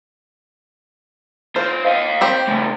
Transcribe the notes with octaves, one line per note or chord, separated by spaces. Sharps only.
B3 F4 C5
D#5 F5
C4 G4 C5
C#3 A3